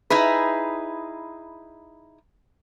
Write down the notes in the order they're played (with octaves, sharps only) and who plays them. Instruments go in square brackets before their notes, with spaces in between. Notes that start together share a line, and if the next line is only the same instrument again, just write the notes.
[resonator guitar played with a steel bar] D#4 E4 G#4 B4